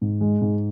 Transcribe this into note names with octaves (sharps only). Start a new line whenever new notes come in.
G#2
G#3
G#2